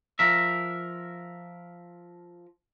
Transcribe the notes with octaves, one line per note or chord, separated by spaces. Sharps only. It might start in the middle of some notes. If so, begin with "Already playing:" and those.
F3 A#4 E5